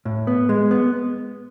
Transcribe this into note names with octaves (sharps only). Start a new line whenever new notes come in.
A2
B3
G#3
B3